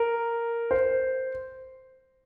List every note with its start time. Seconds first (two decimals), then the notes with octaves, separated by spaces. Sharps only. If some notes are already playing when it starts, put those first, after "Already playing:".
Already playing: A#4
0.71 C5